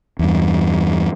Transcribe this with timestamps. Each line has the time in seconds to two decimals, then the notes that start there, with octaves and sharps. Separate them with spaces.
0.19 E2 G2